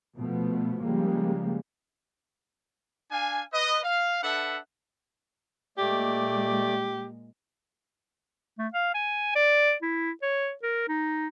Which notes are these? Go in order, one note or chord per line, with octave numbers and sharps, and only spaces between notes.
B2 F3 A3 B3
C#3 F3 G3 G#3 A#3
D4 F5 G#5
B4 D#5
F5
D4 A4 B4 E5 F#5
A#2 G#3 A3 G4 D5
A3
F5
G#5
D5
E4
C#5
A#4
D#4